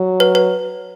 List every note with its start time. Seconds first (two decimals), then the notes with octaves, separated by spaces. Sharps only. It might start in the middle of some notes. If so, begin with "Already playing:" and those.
Already playing: F#3
0.20 B4
0.35 B4